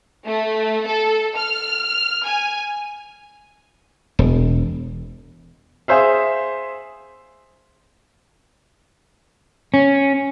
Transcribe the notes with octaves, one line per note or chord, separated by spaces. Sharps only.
A3
A4
F6
G#5
E1
G#4 C5 E5 F5
C#4